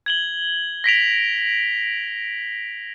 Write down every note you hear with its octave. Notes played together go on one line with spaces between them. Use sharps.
G#6 F#7 G7
A#6 B6 D7 F7